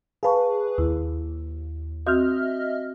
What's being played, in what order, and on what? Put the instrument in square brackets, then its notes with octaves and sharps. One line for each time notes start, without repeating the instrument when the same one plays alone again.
[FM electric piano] G#4 B4 [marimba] F5 A5 C#6
[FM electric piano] D#2 [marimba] E4
[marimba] C4 F#4 G6 [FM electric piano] D#5 E5 F6